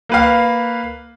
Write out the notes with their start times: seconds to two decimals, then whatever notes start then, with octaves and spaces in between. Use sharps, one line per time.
0.09 A#3 B4 F5